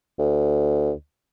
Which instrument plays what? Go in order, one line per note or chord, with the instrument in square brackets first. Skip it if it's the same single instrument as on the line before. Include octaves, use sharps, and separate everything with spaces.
[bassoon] D2